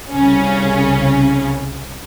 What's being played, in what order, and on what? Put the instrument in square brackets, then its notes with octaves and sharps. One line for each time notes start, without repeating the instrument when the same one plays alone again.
[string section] C2 C#3 C#4